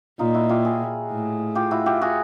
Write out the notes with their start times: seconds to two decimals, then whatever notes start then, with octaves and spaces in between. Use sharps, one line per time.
0.19 A#2 D#4 F4
0.34 E4 F#4
0.49 F4 G4
0.65 F#4 G#4
1.11 A2
1.55 F4 G4
1.71 E4 F#4
1.86 F4 G4
2.01 F#4 G#4